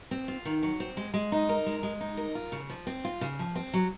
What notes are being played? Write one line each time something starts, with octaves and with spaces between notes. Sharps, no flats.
C4
F4
D#3
F#3
C4
G#3
G#3
D#4
A#4
G#3
G#3
D#4
A#4
F4
C#3
F3
C4
F4
C#3
F3
C4
F#3